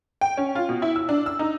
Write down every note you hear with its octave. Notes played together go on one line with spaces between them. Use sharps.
G5
C#4
F4
B2
E4
E6
D4
E6
D#4